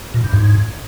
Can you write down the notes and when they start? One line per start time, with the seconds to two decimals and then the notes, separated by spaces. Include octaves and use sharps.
0.14 A#2
0.24 G2
0.33 G#2